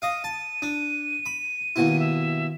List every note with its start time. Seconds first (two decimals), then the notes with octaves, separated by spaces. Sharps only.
0.02 D#5 F5 D#7
0.24 A5
0.62 D4
1.26 B5
1.76 D#2 B2 E4
2.00 E5